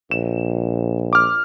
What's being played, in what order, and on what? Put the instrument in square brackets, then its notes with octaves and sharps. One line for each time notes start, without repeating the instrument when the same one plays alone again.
[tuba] A#1 [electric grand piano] E7
[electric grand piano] D6 F6